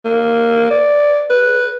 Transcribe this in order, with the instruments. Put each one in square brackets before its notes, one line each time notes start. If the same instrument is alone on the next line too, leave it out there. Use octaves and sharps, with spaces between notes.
[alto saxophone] A#3
D5
B4